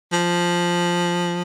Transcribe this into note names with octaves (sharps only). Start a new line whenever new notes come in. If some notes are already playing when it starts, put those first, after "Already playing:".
F3